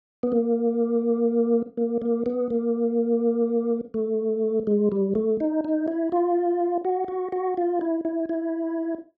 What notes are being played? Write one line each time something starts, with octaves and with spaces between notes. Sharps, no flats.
B3
A#3
A#3
A#3
B3
A#3
A3
G#3
G3
A3
D#4
D#4
E4
F4
F#4
F#4
F#4
F4
E4
E4
E4